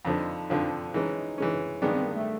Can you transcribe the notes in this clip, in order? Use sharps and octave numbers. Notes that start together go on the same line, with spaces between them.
F2 D3 F3 D#4
F2 D3 F3
E3 G#3 C#4 D#4
E3 G#3 C#4
G2 D#3 G#3 B3 C#4 D4
C4
A#3
A3